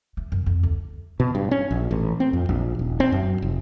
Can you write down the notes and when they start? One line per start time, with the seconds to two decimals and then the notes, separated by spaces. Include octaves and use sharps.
0.17 A3
0.32 F#2
0.46 F2
0.63 D2
1.20 B2
1.35 G2
1.51 C#4
1.71 A#1
1.91 A1
2.20 C4
2.33 F2
2.49 A#1
2.79 D#1
3.00 C4
3.12 F#2
3.42 F1